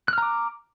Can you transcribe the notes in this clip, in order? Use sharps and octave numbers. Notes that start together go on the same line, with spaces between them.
A#5 D6 F6 F#6